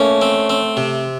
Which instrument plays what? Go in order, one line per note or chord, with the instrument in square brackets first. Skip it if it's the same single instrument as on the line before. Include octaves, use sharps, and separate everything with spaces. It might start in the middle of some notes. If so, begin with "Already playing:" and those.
Already playing: [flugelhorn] A3 [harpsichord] A#3 C#4
[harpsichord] C4
C4
C3